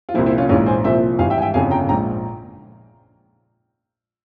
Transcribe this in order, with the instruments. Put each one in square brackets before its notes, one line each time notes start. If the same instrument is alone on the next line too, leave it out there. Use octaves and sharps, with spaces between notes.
[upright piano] F4
C2 A#2 F3 C4 E4
C4 E4
C#4 F4
A#1 G#2 E3 C#4 F4
G#4 C5
C2 A#2 F3 C5 E5
G#1 G2 E3 F5 G#5
E5 G5
G#5
E5 G5
G1 F2 C#3 F5 G#5
G5 A#5
A#1 G#2 F3 G5 A#5